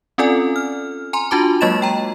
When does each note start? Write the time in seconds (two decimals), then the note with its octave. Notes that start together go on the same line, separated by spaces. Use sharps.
0.18 C4 C#4 F4 A4 D5 G#5
0.56 F6
1.13 G#5 A#5 C6
1.31 D4 F4 F#4 A5 D6
1.61 F#3 G#3 A#3 D#5 A6 E7
1.82 G5 A#5